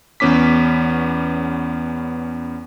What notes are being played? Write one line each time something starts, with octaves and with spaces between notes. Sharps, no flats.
E2 B3 C#4 D6 B6